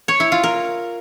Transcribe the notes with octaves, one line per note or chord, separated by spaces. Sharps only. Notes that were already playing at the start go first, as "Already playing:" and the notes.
C#5
E4
F4
A#4